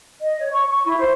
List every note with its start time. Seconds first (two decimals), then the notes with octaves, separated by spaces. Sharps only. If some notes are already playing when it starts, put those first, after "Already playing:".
0.21 D#5
0.39 C#5
0.51 C#6
0.68 C#6
0.85 E4
0.98 C5